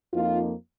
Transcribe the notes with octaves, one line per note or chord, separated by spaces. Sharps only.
F2 F3 A#3 D#4 F4